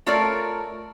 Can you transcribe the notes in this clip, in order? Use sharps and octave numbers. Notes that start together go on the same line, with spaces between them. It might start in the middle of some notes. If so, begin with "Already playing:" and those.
A3 F4 A4 A#4 C#5 D5